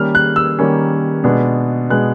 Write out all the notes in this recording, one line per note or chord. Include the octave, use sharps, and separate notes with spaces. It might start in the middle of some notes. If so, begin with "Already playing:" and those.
Already playing: D#3 G3 A#3 C#4 F6
F#6
E6
D#3 G3 A#3 C#4
B2 G#3 B3 D4
B2 G#3 B3 D4 F#6